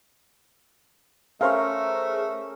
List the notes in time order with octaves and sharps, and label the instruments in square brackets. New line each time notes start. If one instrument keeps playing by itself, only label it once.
[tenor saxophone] A3 [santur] C#4 A#4 [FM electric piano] G#4 C5 E5 [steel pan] F5